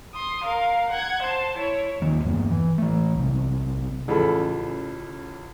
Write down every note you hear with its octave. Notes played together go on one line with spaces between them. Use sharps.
C6 D#6
A#4 F5
F#5 G#6
C5 A5
E4 C#5
D#1 D#3 A#3
E2 G2 A#3
E3
E3 A3
B1 C3
A1 C#3 F3 A4 B5